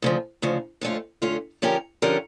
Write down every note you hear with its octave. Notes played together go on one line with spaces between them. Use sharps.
D2 C#3 F3
D2 C#3 F3
F2 D3 A3 C#4 F4
F2 D3 A3 C#4 F4
D3 F3 C#4 G4 A#4
D3 F3 C#4 G4 A#4